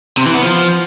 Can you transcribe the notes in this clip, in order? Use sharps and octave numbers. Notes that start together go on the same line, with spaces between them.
C3
E3
B3
F3